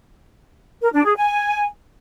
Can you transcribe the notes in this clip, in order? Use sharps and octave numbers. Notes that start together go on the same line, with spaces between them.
A#4
D4
G#4
G#5